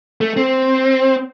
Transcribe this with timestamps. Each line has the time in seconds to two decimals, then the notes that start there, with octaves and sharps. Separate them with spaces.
0.21 A3
0.37 C4